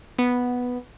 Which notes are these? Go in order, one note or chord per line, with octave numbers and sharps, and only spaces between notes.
B3